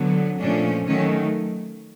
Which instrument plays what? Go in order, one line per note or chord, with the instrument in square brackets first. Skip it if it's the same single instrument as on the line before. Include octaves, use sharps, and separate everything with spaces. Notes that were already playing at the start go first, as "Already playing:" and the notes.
Already playing: [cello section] D3 F#3 B3
A#2 F3 A3 C#4 D4
D#3 F#3 A3 C#4